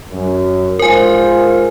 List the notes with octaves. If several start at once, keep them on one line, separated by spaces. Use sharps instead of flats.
F#2
G#2 F4 A#4 C5 G#5